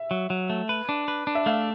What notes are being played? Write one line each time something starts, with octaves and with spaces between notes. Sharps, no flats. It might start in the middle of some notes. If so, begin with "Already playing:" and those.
Already playing: E5
F#3
F#3
A3
B4
D4
B4
D4
E5
A3 F5